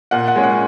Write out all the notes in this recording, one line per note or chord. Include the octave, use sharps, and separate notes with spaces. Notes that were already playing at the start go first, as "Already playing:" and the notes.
A#2 F#5
F#5
G#3 C#4
F#5